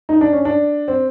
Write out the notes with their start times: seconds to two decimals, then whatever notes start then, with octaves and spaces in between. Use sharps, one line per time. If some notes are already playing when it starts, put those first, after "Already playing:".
0.09 D#4
0.21 D4
0.33 C#4
0.45 D4
0.88 C4